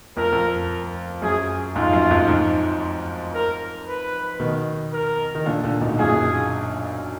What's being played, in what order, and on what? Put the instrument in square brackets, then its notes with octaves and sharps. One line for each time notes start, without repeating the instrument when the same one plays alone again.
[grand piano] F2 [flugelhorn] A#4
[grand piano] F2
[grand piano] F#2 [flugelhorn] G#4
[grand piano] F2 G#2 [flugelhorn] F4
[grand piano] F#2
F2 G#2
F2 G#2
[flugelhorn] A#4
B4
[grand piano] B2 D#3
[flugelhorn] A#4
[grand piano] D#3
A#2 D3
A#2 D3
G#2 B2
[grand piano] F#2 A#2 [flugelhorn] G#4